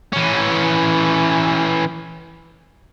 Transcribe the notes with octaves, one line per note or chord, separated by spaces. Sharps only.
E3 C#4